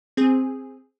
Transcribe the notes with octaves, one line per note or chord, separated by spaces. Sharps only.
C4 G#4